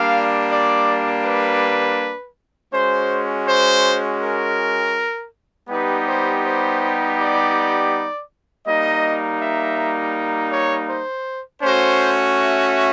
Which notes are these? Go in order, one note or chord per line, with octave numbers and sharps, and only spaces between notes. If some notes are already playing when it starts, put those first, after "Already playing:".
Already playing: G3 A#3 D4 F5
D5
B4
G#3 C#4 F#4 C5
C5
A#4
G3 B3 D#4 G4 B4
C5
C5
D5
G3 A#3 D#4 D#5
E5
C#5
C5
A3 C#4 F#4 C5
E5